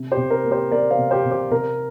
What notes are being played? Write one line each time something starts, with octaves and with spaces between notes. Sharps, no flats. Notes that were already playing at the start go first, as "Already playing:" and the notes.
Already playing: C3
G4 C5
C3
A#4
A#3
G4 C5
A#3 A#4 D5
C5 F5
C3
G4 C5
C3
G4 C5
C3 A#4